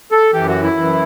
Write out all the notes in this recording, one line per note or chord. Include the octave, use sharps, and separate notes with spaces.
A4
F#2 E3 G4
F#4
E4
F#2 E3